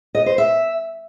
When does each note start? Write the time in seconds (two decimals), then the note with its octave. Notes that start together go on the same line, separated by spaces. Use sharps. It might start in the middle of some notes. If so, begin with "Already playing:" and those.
0.15 D#5
0.26 C5
0.38 E5